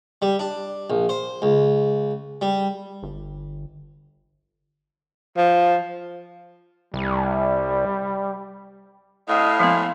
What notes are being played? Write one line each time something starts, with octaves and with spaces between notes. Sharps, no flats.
G3
D4
A#1
C5
C#2
G3
G1
F3
C2 G3
A2 D#5 F5
F3 G#3 B3 C5